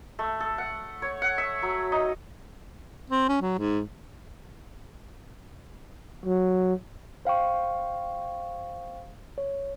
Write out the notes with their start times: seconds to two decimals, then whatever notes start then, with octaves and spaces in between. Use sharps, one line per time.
0.19 A3
0.40 A4
0.58 F#5
1.02 C#5
1.22 F#5
1.38 E5
1.62 F#3
1.92 D#4
3.10 C4
3.28 C#4
3.41 F#3
3.58 G#2
6.25 F#3
7.25 C5 F5 G5 C#6
9.38 C#5